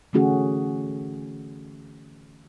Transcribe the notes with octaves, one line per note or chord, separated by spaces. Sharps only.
D3 E3 A3 C#4 F#4 G#4